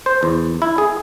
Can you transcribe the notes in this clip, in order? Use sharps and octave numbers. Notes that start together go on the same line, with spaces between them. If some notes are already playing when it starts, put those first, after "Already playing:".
C5
E2
E4
G#4